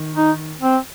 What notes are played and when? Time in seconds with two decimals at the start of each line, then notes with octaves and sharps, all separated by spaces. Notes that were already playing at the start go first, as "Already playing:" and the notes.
Already playing: D#3
0.16 D#4
0.62 C4